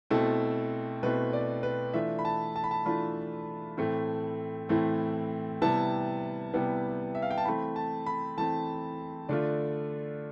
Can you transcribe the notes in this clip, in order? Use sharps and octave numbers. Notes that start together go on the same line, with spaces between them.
B2 A3 C4 E4 A4
B2 A3 C4 E4 B4
D5
B4
E3 A3 D4 F4 E5
B5
A5
A5
B5
A5
E3 A3 D4 F4 B5
A2 E3 A3 C4 E4
A2 E3 A3 C4 E4
C3 G3 B3 E4 A5
C3 G3 B3 E4
E5
F5
G5
A5
E3 A3 C4 B5
A5
B5
E3 A3 C4 A5
D3 A3 D4 F4 D5